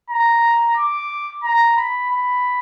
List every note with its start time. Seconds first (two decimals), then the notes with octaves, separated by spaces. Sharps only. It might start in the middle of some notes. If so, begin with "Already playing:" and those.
0.10 A#5
0.77 D6
1.43 A#5
1.76 B5
2.10 B5